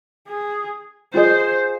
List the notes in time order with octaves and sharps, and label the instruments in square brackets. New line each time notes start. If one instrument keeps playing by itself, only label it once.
[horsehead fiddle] G#4
[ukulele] F4 G#4 D#5 [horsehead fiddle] C5